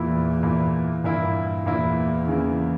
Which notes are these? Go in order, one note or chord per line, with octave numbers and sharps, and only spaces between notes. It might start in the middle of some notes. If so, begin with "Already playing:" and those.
Already playing: E2 A#2 A#3 E4
A#2 A#3 E4
G2 A#2 A#3 E4
E2 A#2 A#3 E4
C#3 E3 A#3